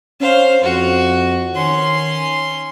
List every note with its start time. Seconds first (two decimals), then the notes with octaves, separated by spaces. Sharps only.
0.21 C#4 C5 F5
0.63 F2 F#4
1.54 D#3 C#4 C6